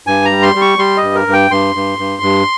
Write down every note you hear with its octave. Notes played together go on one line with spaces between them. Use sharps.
G2 G#5
A#5
G3
C6
G3
C#6
G3 C6
D#5
G2
A#4
G2
G5
G2 C6
G2
G2
G2